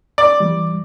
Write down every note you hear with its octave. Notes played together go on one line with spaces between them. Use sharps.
D5
E3 G3